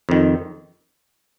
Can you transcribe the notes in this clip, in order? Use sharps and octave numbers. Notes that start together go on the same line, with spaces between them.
F2 D#3